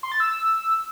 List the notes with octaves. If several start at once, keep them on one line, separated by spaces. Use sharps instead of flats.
C6
A6
E6